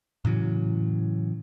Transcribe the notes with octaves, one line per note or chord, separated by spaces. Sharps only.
A2 C#3 E3 F#3